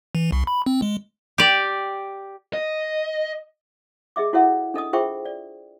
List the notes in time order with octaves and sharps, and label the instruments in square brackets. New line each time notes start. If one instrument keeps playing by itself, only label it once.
[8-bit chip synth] E3
C2
B5
C4
G#3
[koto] G4 D5
[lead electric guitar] D#5
[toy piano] G#4 D#5 E5 D6
E4 F#4 A4 C#5 E5 F#5
D4 A4 D#5 D#6
F4 G#4 C5 E5 G5 C#6
D5